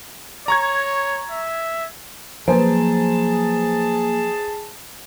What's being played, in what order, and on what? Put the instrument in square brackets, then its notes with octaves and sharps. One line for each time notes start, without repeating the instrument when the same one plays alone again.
[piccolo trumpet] C#5 [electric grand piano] A#5 C#6 G#6
[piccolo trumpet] E5
[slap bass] F3 F#3 [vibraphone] A#3 [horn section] G#4 A5 [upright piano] B4 C5